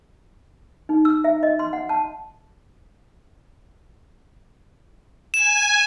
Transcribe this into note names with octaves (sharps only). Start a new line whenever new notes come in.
D#4
E6
E5
D#5
C6
F#5
A5
G#5 E7